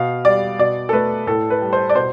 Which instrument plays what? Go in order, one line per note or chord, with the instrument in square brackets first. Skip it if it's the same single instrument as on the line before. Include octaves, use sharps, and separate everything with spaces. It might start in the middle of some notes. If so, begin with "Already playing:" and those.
Already playing: [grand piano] B2 F5
G3 D5
B2 D5
A4
A3 B4
A2 A4
B4
G3
C5
D5
B2 C5